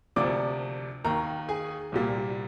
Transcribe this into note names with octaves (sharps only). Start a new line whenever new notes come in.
D2 C3 F3 A#3 D4 D5 D6
D#2 D#3 A#3 A#4 A#5
G#4 G#5
C2 A#2 G3 A#3